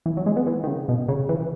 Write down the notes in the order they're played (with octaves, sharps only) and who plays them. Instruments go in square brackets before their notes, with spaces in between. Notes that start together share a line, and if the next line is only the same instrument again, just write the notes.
[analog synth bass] E3
F#3
G#3
B3
E3
D#3
C#3
B2
C#3
E3